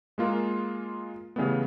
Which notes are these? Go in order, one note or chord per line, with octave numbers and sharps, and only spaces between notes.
G#3 A#3 F4 G#4 A#4
C#3 E3 G3 A3 B3